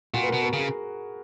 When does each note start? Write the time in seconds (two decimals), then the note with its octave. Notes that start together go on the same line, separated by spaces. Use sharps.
0.14 A#2 F#4
0.23 B4
0.29 B2 A#4
0.43 A#4
0.53 C#3 G#4